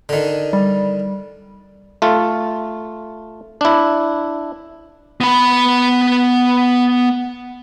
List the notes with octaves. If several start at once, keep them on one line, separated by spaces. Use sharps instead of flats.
D3 D#3
G3
A3 F4
D4 E4
B3 B5